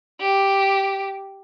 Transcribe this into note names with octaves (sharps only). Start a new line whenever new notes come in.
G4